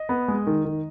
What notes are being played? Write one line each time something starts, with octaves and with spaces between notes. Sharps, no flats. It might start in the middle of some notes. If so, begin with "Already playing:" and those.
Already playing: D#5
B3
G#3
D#3
D#3